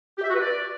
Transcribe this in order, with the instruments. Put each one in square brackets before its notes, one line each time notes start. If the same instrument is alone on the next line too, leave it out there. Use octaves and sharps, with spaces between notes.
[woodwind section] G4
E5
F#4
B4
D5